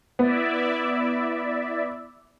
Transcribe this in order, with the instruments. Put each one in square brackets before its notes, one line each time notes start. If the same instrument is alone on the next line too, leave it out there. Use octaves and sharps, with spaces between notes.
[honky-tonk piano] B3 [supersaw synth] E4 D5 E5